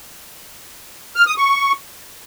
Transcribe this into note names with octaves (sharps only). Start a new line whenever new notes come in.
F6
D#6
C#6